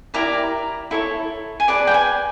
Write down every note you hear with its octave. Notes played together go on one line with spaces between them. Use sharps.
E4 G4 A#4 D5 A#5
E4 A4 C#5
G#5
G#4 B4 D5 A5
G5
G#5